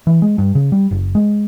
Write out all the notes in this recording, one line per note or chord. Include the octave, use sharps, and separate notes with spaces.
E3
G#3
G2
C#3
G3
F#1
G#3